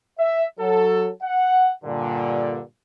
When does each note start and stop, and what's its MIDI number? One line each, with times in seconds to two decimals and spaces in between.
0.20 0.45 76
0.60 1.09 54
0.60 1.09 69
1.23 1.71 78
1.85 2.62 43
1.85 2.62 46
1.85 2.62 50